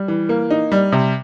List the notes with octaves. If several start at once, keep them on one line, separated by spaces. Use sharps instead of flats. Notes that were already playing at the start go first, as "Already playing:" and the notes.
Already playing: G3
E3
A#3
D#4
G3
C3